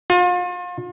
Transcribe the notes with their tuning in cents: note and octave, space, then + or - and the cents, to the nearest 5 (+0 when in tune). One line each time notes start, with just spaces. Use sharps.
F4 +35